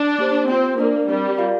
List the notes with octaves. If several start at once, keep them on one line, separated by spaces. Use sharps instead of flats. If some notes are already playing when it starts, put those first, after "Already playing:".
Already playing: D4
A#3 G4 C5
C4 F4 C5 G5
A#3 D4 A#4 D5
G3 C4 A#4 D5
F4 A#4 D5 F5